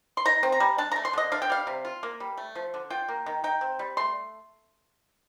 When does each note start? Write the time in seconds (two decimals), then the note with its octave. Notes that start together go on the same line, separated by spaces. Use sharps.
0.17 C6
0.25 D#4 A#5
0.43 C4
0.52 A#5
0.60 G3
0.78 D4 A5
0.92 A#5
0.96 A3
1.05 C6
1.13 D3 D#5
1.32 D4 F5
1.42 G5
1.50 G3 F5
1.67 C3
1.85 F4
2.03 A#3
2.20 G3
2.37 A3
2.55 F3
2.74 D3
2.90 F4 G5
3.09 A#3
3.26 D#3
3.44 D#4 G5
3.61 C4
3.79 G3
3.97 A3 C6